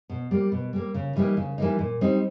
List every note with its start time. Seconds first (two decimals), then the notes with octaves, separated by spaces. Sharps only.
0.10 B2
0.31 G3 A#3
0.52 B2
0.73 G3 A#3
0.94 C#3
1.16 E3 G3 A#3 D#4
1.37 C#3
1.58 E3 G3 A#3 D#4
1.79 A#2
2.01 G3 C4 D#4